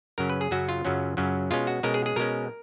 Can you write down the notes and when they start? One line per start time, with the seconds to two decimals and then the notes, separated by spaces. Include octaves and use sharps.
0.18 F#2 C#3 F#3 C#4 A#4
0.30 B4
0.41 G#4
0.51 F#2 C#3 F#3 C#4 F#4
0.69 F4
0.85 F#2 C#3 F#3 C#4
1.17 F#2 C#3 F#3 C#4
1.51 B2 G#3 C#4 F4
1.67 F#4
1.83 B2 G#3 C#4 A#4
1.94 G#4
2.06 G#4
2.16 B2 G#3 C#4 A#4